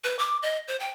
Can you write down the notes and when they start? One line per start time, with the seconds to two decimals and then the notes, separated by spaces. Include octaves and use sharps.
0.04 B4
0.19 D6
0.43 D#5
0.68 C5
0.80 G5